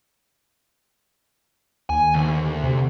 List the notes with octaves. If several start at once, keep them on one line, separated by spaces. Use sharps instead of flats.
D#2 G#5
D2
C3